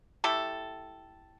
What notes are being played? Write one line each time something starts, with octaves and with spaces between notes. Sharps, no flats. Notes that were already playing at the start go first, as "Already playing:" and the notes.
A3 E4 G4 A4